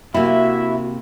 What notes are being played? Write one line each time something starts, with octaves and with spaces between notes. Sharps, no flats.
C3 A#3 E4 F#4 E5